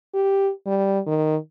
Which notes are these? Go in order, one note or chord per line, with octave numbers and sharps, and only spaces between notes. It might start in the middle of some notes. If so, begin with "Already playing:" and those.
G4
G3
D#3